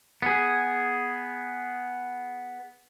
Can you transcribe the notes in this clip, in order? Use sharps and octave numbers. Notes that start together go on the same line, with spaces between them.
B3 G#4